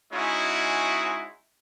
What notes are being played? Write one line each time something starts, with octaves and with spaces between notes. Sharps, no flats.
G#3 C#4 D#4 E4 F#4